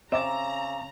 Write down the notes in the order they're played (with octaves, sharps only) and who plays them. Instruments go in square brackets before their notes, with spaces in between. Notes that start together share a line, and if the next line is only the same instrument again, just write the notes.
[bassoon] C#3 [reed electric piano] C4 D6 A6 [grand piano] E5 E7 [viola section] A#5